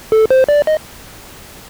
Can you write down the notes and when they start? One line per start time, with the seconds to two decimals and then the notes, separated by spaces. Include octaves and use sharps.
0.12 A4
0.31 C5
0.49 D5
0.67 D#5